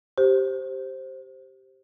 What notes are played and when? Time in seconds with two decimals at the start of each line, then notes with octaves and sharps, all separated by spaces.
0.18 G4 C5